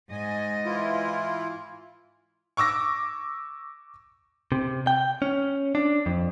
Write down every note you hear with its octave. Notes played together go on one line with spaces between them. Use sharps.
G#2 D#5 G#5
E3 E4 F4
C#6 D6 E6 A#6
C3
G5
C#4
D4
F2